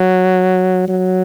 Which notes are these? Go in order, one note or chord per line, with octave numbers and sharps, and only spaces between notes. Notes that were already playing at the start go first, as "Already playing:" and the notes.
Already playing: F#3
F#3